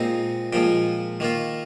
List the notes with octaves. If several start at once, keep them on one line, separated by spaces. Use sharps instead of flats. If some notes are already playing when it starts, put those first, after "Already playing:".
Already playing: A#2 G#3 C4 D#4
A#2 F3 G#3 G5
D#3 A#3 F4